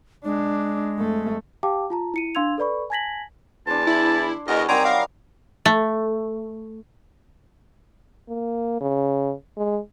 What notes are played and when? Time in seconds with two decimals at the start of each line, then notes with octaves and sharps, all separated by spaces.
0.25 G#3 D4
0.99 F2 A3
1.63 G4 F5 G5 A5 D6
1.90 F4 A5 A#5
2.14 E4 C#7 D#7
2.35 D4 F5 C6 E6 G#6 F7
2.58 A4 B4 D5 B5 C#6
2.90 G#5 A5 G#6 A#6 B6 F#7
3.67 E2 D4 C5 A5
3.87 E4
4.48 E2 F#4 A#4 C#5 D#5 B5
4.68 D#3 F#3 G3 C4 G#5 A#5
4.85 A#4 F5
5.66 A3
8.29 A#3
8.81 C#3
9.57 G#3